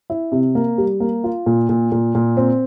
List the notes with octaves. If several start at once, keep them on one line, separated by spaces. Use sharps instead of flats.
E4
C3
A#3
G3
A#3
F4
A#2
A#2
A#2
A#2
C4